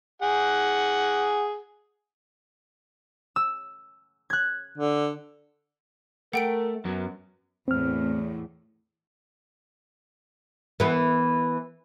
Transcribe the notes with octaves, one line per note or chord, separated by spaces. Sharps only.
G#4 F#5
E6
F#6 G#6
D3
A3 A#4 F#5 G5 D7
F#2 F#3 B3
E2 A2 C4 F6
E3 B3